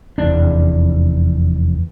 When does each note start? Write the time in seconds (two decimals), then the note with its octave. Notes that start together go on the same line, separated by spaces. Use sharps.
0.18 F1 E2 D4